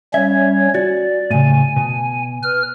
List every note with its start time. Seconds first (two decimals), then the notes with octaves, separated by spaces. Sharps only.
0.14 G3 C#4 C#5 E5
0.75 F#4 D5
1.31 A2 C#3 G#5
1.76 B2
2.43 B4 F6